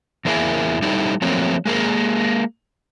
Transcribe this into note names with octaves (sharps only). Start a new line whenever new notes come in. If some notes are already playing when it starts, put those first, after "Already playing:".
E2 G#3 A#3 E4 G#4 A#4
G3 D#4 E4 G4 A4
F3 F#3 A3 A#3 C4
G#3 A#3 G#4 A#4